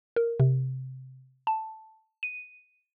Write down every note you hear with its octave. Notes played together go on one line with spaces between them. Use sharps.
A#4
C3
A5
D#7